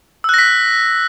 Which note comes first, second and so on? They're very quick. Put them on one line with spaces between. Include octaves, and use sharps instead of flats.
E6 F#6 A#6 B6